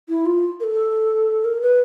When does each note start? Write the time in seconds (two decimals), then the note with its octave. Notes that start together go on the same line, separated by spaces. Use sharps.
0.09 E4
0.26 F4
0.60 A#4
0.64 A4
1.44 A#4
1.61 B4